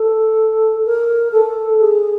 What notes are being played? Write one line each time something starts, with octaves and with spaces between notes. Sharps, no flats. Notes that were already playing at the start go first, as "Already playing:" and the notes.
Already playing: A4
A#4
A4
G#4